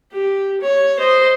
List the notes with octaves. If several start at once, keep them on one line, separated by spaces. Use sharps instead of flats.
G4
C#5
C5 D#5